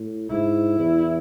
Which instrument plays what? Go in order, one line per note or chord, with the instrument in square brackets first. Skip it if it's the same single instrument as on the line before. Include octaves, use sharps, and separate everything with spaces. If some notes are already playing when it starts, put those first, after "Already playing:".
Already playing: [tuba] A2
[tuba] G#2 [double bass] E4
[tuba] E2